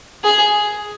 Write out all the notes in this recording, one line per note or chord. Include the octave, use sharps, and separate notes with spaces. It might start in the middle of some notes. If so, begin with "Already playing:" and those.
G#4